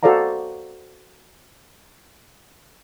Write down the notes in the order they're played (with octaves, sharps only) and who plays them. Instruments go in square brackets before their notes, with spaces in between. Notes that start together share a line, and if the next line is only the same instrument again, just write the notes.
[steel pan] F#4 A4 C5 D5 F5 A#5